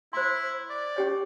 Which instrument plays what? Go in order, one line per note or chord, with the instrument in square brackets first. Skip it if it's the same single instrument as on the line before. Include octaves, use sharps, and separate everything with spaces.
[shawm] E4 [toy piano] C5 C6
[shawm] D5
[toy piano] C#4 G4 C#5